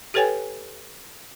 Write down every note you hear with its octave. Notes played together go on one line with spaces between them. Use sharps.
G4 A4 B4 C#5 G5 G#5